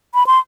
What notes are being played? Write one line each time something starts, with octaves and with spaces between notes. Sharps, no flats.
B5
C6